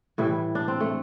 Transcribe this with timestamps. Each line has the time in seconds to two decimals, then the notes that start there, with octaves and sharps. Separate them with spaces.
0.18 A2 E3 G3 E4
0.55 D4
0.68 C4
0.80 A3